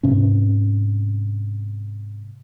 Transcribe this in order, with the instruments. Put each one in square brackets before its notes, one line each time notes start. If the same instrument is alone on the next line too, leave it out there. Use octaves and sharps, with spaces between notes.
[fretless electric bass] G#2 C3 C#4